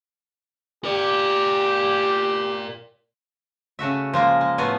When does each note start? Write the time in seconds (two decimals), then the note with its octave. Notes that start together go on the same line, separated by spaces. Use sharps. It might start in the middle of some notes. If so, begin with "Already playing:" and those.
0.85 G4 A#4 D5
3.79 C#3 A3 F#4 E5
4.14 F3 G#3 A#3
4.41 G#3
4.58 A2 F3 A3 B3 F#4 G#5